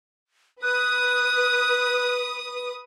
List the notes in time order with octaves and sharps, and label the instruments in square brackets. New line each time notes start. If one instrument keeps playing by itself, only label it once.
[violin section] B4 D#6 [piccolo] F#6